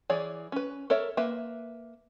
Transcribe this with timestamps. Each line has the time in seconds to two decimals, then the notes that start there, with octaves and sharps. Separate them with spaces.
0.10 E3 G#4 C#5 D5
0.52 C#4 B4
0.90 A4 A#4 C#5 E5
1.17 A#3 B4 E5